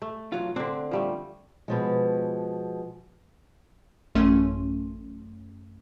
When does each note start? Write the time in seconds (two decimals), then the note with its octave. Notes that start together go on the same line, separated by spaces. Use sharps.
0.02 A3
0.32 B1 F#3 F4
0.56 D3 C4 D4
0.91 F3 G3 A3
1.68 B2 F3 G#3
4.15 A1 F#2 A3 C#4 C6 D#7